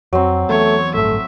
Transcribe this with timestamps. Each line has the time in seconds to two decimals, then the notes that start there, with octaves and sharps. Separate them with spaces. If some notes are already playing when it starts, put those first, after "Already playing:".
0.13 F2 F#3 C4
0.49 E3 A3 B3 C#5
0.95 A1 G2 A3 E5